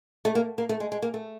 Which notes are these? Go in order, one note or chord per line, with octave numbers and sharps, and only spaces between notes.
A3
A#3
A#3
A3
G#3
G#3
A#3
A3